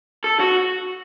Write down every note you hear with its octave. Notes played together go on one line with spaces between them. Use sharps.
A4
F#4